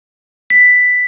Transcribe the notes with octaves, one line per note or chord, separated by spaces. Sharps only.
B6